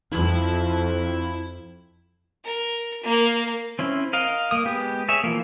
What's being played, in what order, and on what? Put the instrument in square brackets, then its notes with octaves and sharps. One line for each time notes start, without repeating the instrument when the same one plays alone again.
[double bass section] F2 [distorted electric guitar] E4 B5
[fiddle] A#4
A#3
[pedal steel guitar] C4 C#4 E4
A#4 D#5 F5
A#3 D#6
G#3 B3 G4
G#4 C#5 E5
E3 F3 A#3